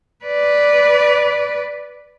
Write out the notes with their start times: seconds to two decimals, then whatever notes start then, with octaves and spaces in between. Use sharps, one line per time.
0.25 B4 D5